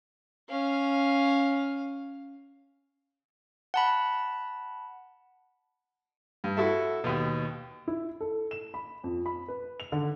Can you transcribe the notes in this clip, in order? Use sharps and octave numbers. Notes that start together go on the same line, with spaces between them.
C#4 F5
F#5 A5 B5
G2
E4 F#4 A4 E5
D#2 B2
E4
A4
E7
B5
F2
B5
B4
F7
D3